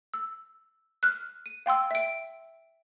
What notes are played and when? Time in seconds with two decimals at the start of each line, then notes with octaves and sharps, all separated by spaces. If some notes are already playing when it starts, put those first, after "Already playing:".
0.14 E6
1.03 F6 F#6
1.46 D#7
1.66 F5 G5 C6 E6
1.91 E5 D7